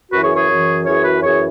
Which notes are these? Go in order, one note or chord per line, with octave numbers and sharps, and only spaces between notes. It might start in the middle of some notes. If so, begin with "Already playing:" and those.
F#2 E3 F#4 B4
G#4 C#5
G#4 C#5
F#2 E3
F#2 E3 G#4 C#5
F#4 B4
F#2 E3 G#4 C#5